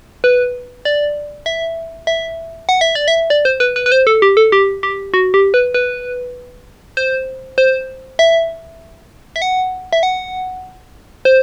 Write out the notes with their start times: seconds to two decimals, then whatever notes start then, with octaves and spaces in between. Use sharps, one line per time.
0.24 B4
0.85 D5
1.46 E5
2.07 E5
2.69 F#5
2.81 E5
2.95 D5
3.08 E5
3.30 D5
3.45 C5
3.60 B4
3.76 B4
3.86 B4
3.92 C5
4.07 A4
4.22 G4
4.37 A4
4.52 G4
4.83 G4
5.14 F#4
5.34 G4
5.54 B4
5.74 B4
6.97 C5
7.58 C5
8.19 E5
9.36 E5
9.42 F#5
9.93 E5
10.03 F#5
11.25 C5